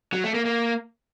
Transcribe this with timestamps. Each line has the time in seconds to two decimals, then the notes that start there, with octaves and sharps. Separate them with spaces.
0.13 F#3
0.24 A3
0.34 A#3
0.45 A#3